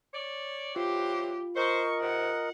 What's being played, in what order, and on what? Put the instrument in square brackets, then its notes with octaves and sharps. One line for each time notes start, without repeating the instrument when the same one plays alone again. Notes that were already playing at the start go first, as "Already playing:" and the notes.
[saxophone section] C#5 D5
[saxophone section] E3 F#3 C5 [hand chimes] F4 [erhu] G4
[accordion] A#4 D#5 [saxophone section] C5 [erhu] C#6
[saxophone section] G#2 C3 [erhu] F#5